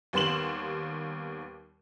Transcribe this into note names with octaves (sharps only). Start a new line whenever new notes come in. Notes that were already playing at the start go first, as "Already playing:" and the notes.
D#2 G3 B3 C6 E7 F#7